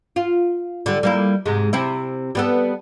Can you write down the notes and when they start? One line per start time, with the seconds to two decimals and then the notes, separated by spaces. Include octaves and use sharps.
0.16 F4
0.86 D3 G3
1.03 G3 A#3 E4
1.46 G#2 C3 G#3
1.73 C3 C4 E4
2.35 G3 B3 A4